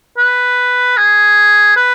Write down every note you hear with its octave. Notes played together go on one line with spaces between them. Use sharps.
B4
G#4
B4